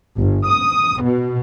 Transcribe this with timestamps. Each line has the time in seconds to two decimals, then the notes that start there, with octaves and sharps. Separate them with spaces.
0.17 G1
0.47 D#6
1.02 B2